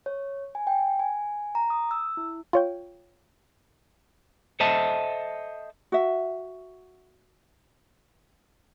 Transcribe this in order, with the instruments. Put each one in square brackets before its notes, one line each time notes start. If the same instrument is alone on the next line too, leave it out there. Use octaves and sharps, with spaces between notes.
[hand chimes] C#5
G#5
G5
G#5
A#5
D#6
E6
E4
[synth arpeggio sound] F4 C#5 G5
[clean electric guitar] A4 C5 D#5 E5 A5
[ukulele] F#4 E5